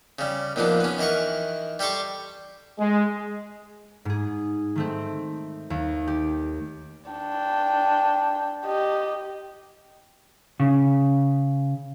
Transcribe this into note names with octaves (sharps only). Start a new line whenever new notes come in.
C#3 G3
D#2 A#2 F3 B3 D4
B3 C#4
D#3 E3 A#4 F#5 C#6
G3 G4 A4 C6 C#6
G#3
G#2 G#4
D#3 A3 C4
D#2
G4
D4 G5
G4 D#5
C#3